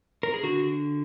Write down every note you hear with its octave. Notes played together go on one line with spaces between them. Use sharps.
A#4
G#4
D3 F#4